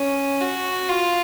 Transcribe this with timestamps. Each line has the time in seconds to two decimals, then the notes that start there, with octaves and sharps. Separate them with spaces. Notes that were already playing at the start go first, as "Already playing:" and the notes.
Already playing: C#4
0.41 F#4
0.89 F4